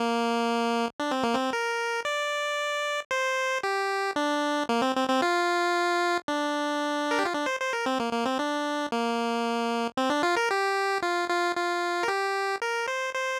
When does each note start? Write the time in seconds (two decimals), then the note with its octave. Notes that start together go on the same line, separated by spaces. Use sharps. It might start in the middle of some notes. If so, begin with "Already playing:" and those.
Already playing: A#3
1.00 D4
1.11 C4
1.23 A#3
1.35 C4
1.53 A#4
2.05 D5
3.11 C5
3.63 G4
4.16 D4
4.69 A#3
4.82 C4
4.96 C4
5.09 C4
5.22 F4
6.28 D4
7.11 A#4
7.19 G4
7.25 F4
7.34 D4
7.46 C5
7.60 C5
7.73 A#4
7.86 C4
8.00 A#3
8.13 A#3
8.26 C4
8.39 D4
8.92 A#3
9.97 C4
10.10 D4
10.23 F4
10.37 A#4
10.51 G4
11.02 F4
11.29 F4
11.56 F4
12.03 A#4
12.08 G4
12.62 A#4
12.88 C5
13.14 C5